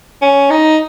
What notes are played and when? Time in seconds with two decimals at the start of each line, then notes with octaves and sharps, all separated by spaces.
0.22 C#4
0.50 D#4